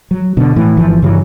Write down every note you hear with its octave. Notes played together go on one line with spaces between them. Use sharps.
F#3
B2 D3
A2 E3
G1 E3 F3
G2 C#3 E3 F#3